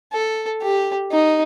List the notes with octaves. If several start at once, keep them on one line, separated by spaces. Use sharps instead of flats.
A4
G4
D#4